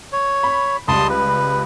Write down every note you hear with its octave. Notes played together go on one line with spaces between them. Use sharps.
C#5
B5
C#2 G3 A5 C6 D#6
B4